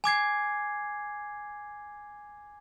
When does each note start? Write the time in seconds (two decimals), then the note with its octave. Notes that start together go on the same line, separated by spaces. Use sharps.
0.04 G#5 D6 G#6 C7